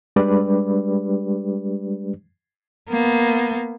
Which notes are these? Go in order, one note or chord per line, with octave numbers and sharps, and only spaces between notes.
G3 G#3 D4 G4 B4 D5
A#3 B3